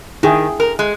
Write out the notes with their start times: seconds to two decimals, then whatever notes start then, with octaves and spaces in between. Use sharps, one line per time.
0.23 D#3 E4 G#4 G5
0.60 A#4
0.79 G#3